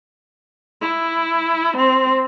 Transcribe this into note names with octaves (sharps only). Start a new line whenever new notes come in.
E4
C4